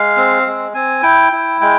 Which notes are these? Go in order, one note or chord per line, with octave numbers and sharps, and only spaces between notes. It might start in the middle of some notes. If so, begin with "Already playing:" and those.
Already playing: G#3 F5
C4
G#3
C4 G#5
E4 G5
E4
G#3 G5